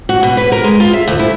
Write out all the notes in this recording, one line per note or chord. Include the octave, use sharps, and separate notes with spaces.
F#4
B2
B4
A#4
G#3
F4
E5
D2
E4